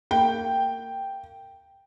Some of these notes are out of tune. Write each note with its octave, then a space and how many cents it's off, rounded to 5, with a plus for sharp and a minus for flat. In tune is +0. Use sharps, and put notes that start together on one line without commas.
A#3 -30 G5 +0